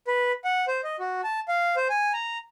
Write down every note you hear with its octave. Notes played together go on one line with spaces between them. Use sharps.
B4
F#5
C5
D#5
F#4
A5
F5
C5
G#5
A#5